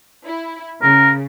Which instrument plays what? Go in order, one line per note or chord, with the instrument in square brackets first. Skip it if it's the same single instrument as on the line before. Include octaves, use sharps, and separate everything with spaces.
[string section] E4
[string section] C#3 [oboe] A#4